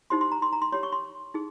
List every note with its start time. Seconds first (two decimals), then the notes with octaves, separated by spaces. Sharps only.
0.10 D#4 G4 C5 C6
0.21 C6
0.32 A#5
0.42 C6
0.53 A#5
0.62 C6
0.72 G4 C#5 C6
0.83 C#6
0.92 C6
1.34 D#4 G#4